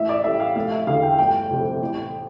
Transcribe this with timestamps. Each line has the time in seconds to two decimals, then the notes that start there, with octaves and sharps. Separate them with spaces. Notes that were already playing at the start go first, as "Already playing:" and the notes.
Already playing: A1 E5
0.09 D5
0.24 A2 G3 E5
0.40 F5
0.56 F1 F5
0.72 E5
0.87 E2 D3 G3 F5
1.02 G5
1.18 G1 G5
1.50 F2 C3 G3
1.81 A1